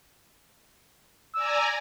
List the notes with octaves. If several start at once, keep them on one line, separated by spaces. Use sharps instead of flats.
D5 G#5 A#5 E6